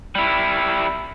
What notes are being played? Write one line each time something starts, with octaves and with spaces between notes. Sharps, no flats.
G3 E4